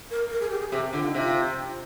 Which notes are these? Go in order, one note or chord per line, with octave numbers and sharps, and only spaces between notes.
A#4
A#4
G#4
G4
G#4
C3 G4
D3 F4
D#4
C3 F4